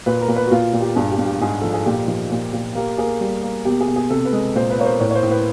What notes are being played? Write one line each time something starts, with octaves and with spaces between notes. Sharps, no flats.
A#2 B4
A#4
A#2
B4
F#4
A#2 F4
A#2
G4
G2 G#4
G4
G2
G4
G#2 G#4
F3 A4
G#4
A#2 G4
F3
A#2
A#2
A#3 G4
A#3 G#4
G3
A#3
B2 G4
G#4
B2
G#4
C3 A4
B4
G#3
A#2 C5
B4
A#3 C#5
C5
A2 C#5
C#5
C5
A2
B4